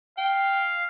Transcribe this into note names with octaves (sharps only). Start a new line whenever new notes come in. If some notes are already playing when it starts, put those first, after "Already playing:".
F5 G5